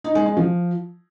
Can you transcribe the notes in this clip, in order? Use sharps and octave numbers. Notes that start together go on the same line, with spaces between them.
D#4
G#3
G#3
F3